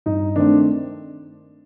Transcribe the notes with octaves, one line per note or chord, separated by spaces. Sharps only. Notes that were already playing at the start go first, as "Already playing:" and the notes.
G2 D#4
D#3 A3 C4 D4